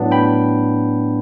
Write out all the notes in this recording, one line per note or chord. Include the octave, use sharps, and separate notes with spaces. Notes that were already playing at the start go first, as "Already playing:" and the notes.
Already playing: A2 F#3 B3 D4
G5 B5